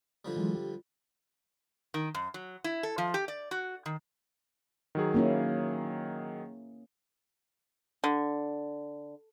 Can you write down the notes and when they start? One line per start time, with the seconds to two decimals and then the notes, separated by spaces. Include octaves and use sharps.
0.25 D3 F3 G3
0.37 E3 F#3 G#3
0.55 G4
1.94 D#3
2.15 F#2
2.34 F#3
2.64 E4
2.83 A4
2.98 F3
3.14 G4
3.28 D5
3.51 F#4
3.86 D#3
4.95 D#3 F#3 G#4
5.14 A#3 C#4 E4
8.04 D3